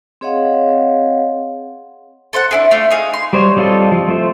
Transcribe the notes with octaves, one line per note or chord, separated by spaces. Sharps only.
C4 G#4 C#5 D#5 F5 F#5
A4 C5 F5 F#5
D4 E4 G#4
A3 F4 D5
D#4 G#4 F5
C6
G3 C5 C#5
G3 C4 F4 A4 D#5
F3
A3 C5